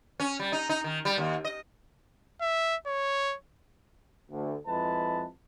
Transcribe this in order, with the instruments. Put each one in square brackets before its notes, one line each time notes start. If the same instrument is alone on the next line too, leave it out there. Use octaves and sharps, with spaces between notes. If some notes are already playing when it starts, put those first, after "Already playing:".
[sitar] C#4
G3
D#4
D#4
D#3
G3
D#2
D#5
[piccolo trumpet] E5
C#5
[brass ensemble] D2
F2 G#3 E4 B4 A5